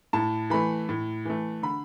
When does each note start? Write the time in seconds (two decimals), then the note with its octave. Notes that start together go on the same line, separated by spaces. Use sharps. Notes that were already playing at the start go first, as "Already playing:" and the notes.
0.13 A2 A5
0.50 E3 A3 B5
0.89 A2
1.25 E3 A3
1.63 D3 B5